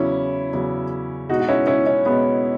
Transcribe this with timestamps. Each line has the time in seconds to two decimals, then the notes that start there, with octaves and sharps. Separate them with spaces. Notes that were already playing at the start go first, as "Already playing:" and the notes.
Already playing: E2 C#3 F#3 C#4 E4
0.53 E2 C#3 F#3
1.29 B2 G#3 D#4 F#4
1.40 F#4
1.49 C#4 E4
1.67 C#4 E4
1.87 C#4
2.06 B2 G#3 B3